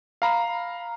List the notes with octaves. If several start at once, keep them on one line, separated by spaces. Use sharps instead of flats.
F5 A#5 B5